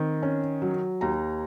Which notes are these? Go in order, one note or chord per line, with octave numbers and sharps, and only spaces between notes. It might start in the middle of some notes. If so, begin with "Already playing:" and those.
Already playing: D#3 C4
C#4
F#3
D#2 A#5